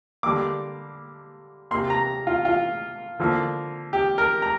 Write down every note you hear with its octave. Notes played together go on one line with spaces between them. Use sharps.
D3 G3 A#3 D6
C3 A#3 C6
A#5
F4
F4
D3 F3 A#3
G4
A#4
A#5